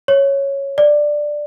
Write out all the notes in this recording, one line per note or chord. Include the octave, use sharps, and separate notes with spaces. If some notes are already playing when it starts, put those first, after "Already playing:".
C#5
D5